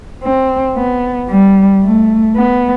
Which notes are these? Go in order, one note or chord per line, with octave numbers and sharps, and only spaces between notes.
C4
B3
G3
A3
B3